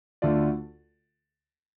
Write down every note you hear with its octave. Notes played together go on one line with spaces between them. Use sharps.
D2 D3 A3 F4 D5